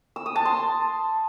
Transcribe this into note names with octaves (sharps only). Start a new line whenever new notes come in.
E6
D#6
A5
C6